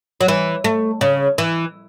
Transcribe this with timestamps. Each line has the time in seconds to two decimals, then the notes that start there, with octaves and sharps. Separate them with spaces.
0.21 F#3
0.28 E3
0.64 A3
1.01 C#3
1.38 E3